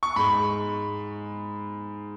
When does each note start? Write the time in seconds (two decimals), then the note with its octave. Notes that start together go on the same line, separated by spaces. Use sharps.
0.03 C#6
0.16 G#2 G#3 B5